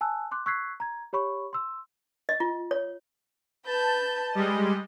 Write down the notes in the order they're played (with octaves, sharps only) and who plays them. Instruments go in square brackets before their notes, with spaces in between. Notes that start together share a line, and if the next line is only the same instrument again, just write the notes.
[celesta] G#5 A5 E6 F#6
C6 D6 F#6
C#6 E6 F#6 G#6 B6 C7
A#5 G#6
G4 C#5 B5 C#6
C6 E6
[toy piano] D#5
F4
C#5
[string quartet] B4 G6 [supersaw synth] A5
[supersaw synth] G3 G#3 [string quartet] D#5